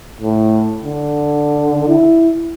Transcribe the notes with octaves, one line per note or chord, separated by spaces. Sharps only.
A2
D3
E4